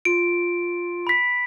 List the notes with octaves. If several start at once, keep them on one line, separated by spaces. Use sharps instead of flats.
F4 D7
B5 B6